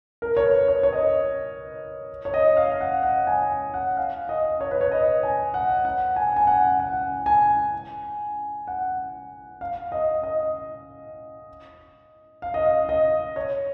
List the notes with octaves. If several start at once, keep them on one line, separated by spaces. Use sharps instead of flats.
A#4
C#5
B4
C#5
C#5
D#5
C#5
D#5
F5
F5
F#5
F#5
G#5
F#5
F5
D#5
C#5
B4
C#5
D#5
G#5
F#5
F#5
G#5
G#5
F#5
F#5
G#5
F#5
F5
D#5
D#5
F5
D#5
F5
D#5
C#5